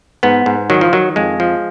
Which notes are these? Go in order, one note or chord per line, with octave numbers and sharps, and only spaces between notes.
G#2 B3
G#2
D#3 F#3
F3
D#3 F#3
F2 G#3
F3